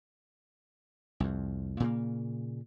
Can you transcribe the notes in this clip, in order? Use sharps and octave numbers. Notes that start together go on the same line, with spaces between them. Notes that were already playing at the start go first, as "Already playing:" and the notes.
C2 F2
A#2 C#3 A#3